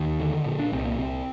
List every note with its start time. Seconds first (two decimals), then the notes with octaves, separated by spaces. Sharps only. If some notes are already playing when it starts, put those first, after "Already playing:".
Already playing: D#2 D#3
0.20 D3
0.46 A#2
0.59 D4
0.72 C2 C4
0.85 A#3
0.98 C2 C4